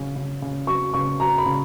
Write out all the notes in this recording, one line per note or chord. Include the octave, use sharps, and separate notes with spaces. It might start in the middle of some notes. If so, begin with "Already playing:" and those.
Already playing: C#3 F#3
C#3
C#3
F#3 C#6
C#3 C#6
F#3 A#5
B5
C#3